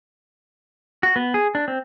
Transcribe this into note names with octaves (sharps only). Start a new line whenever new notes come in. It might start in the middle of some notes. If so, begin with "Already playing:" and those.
F#4
B3
G#4
D4
C4